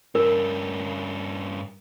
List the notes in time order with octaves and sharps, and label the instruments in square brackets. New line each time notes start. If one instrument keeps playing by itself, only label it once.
[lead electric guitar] G2 C#4 [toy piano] A#4